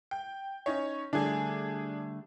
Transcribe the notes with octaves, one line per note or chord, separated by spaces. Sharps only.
G5
C#4 D#4 C#5
D3 G3 A3 D4 G#4